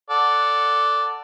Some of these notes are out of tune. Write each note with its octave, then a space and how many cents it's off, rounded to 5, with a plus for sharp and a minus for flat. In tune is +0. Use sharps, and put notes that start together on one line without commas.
A4 +10 D5 -5 F#5 +0